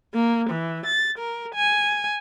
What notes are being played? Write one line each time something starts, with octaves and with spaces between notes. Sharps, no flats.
A#3
E3
A6
A#4
G#5